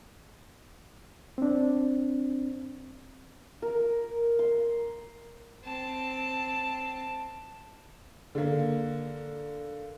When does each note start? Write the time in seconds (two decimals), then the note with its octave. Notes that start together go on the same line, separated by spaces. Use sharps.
1.38 C4 D4
3.62 A#4
4.39 C6
5.64 C4 A5
8.35 D3 A#3